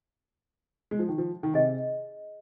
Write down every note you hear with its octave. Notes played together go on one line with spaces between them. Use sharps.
G#3
F3
D#3
F3
D#3
C3 G#4 D#5 G#5